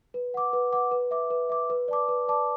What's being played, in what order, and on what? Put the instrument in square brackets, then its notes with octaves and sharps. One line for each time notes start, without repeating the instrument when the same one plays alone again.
[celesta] B4
F#5 D6
B4
F#5 D6
B4
E5 D6
B4
E5 D6
B4
D5 A5 D6
B4
D5 A5 D6